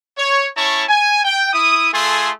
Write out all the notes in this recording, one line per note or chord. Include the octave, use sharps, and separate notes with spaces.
C#5
C#4 E4 C#5 A5 C#6
G#5
G5
E4 D#6
A3 F4 G#4 A4 G#5 C6